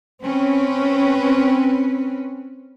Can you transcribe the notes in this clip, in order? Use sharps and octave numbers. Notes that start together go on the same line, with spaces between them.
C4 C#4 B4